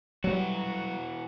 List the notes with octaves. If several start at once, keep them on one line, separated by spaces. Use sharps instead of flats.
E3 F#3 G3 F#4